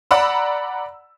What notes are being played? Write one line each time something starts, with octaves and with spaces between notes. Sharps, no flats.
D5 F#5 A#5 B5 E6